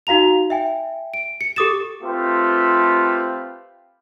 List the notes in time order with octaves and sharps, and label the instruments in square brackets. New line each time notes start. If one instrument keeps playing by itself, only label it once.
[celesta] D#4 F#4 F5 A#5 F7
E5 G5 G#5
D7
C#7
G4 A4 D6 D#6 A6 E7
[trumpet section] A3 C4 F4 G4 B4